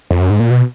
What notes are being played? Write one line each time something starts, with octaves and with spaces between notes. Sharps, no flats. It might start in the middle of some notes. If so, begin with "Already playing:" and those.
F2
F#2
G#2
A#2
B2